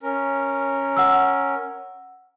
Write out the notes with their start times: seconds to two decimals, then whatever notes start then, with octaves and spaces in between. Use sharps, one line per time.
0.03 C#4 A#4
0.97 F#5 E6